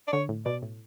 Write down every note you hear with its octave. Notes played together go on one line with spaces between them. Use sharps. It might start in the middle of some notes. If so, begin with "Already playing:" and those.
D5
D3 C#5
A2
B2 D5
A2